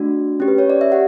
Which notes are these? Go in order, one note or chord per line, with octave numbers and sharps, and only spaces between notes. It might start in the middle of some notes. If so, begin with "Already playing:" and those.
Already playing: A3 D4 F#4
C#4 G4
B4
C#5
D5
E5
G4 F#5